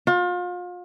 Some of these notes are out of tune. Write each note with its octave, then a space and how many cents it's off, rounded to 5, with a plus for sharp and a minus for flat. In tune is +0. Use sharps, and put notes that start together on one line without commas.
F4 +35